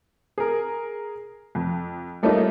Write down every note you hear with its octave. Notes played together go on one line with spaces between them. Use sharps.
G#4 A#4
F2
G3 A3 A#3 C#4 D#4 F4